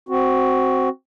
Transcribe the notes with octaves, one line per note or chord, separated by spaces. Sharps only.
C4 F#4